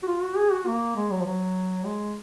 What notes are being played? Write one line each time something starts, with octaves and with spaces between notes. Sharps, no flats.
F#4
F4
F#4
G#4
F#4
A#3
G#3
F#3
F3
F#3
G#3